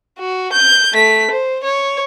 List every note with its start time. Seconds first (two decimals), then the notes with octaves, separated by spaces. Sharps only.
0.19 F#4
0.53 G6
0.93 A3 B6
1.31 C5
1.64 C#5